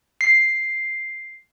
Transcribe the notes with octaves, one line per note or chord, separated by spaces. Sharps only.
C7